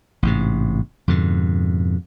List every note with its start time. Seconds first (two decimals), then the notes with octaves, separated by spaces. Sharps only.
0.23 A1 G#2 C3
1.08 F2 G#2 B2 D3